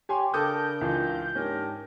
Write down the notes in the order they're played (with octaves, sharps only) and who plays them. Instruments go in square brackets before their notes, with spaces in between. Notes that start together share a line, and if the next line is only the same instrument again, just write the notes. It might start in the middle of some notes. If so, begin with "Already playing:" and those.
[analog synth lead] G4 [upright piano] C#5 G#5 C6
[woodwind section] C#3 D4 A#4 [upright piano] A4 D6 D#6 [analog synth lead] G6
[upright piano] C#2 E3 F4
[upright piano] G#2 C#4 [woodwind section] D4 G4 A#4